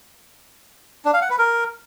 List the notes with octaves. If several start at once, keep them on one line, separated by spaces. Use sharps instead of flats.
D4
F5
F#5
B4
A#4